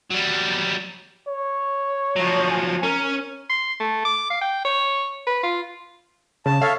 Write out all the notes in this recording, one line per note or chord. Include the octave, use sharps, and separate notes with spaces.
F#3 G3
C#5
F3 F#3
G#5
C#4 A#4
C6
A3
D6
F5
G5
C#5
B4
F4
C#3 A5
A4 C#5 E5 F5